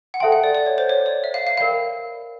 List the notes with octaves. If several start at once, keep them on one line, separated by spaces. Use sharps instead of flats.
F#5
A4 C5 E5 G5 A5 C6
F#5
D5
D5
C#5
C5
C#5
D5
E5
F5
F5
A#4 D5 F5 G5 B5